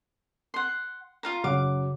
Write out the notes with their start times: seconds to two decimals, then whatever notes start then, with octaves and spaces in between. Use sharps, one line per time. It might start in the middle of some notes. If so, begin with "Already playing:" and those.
0.54 F#5 C6
1.23 F4 F5 A#5
1.44 F#2 C#3 F#5 D6